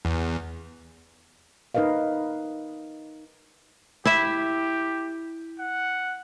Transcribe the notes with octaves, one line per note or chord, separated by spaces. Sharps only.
E2
D#4 A#4 B4 D#5 F5
E4 G4 E5
F#5